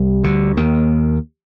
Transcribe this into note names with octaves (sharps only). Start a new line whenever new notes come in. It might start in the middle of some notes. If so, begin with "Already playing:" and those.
Already playing: C2 G3
D2 D3
D#2 D#3 A#3